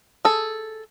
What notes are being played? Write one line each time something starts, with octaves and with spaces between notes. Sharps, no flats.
G#4 A4